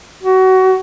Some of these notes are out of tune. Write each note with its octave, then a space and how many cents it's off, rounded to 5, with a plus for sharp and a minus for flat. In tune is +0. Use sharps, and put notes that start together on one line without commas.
F#4 +25